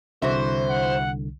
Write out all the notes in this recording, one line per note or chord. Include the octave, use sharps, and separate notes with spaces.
C2 D3 E3 F#4 C5 E5
F#5